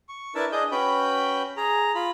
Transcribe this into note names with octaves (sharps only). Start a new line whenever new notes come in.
C#6
D4 E4 A#4 B4 E5 A5
D4 G#4 D#5 G6
C#4 F#4 B4 G5 B5 G6
G#4 A#5
F4 B5